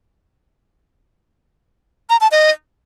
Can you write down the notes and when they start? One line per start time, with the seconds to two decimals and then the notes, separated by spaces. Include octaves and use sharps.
2.10 A#5
2.21 A5
2.32 D#5